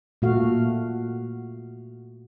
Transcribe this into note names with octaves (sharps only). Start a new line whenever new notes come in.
A#2 A3 F#4 F5